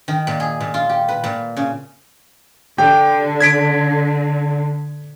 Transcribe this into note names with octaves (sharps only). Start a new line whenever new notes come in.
D#3
A#2
G#4
A#2
F4
G4
B4
A#2
C#3
D3 G4 G5
G#6 B6 D7